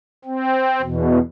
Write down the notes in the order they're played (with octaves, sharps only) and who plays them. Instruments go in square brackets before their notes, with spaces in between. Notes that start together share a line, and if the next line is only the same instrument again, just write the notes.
[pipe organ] C4
E2 B2